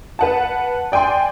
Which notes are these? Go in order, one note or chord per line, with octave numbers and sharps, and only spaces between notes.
B4 F#5 A5
D5 G5 G#5 C6